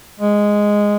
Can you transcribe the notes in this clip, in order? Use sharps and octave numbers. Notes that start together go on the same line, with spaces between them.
G#3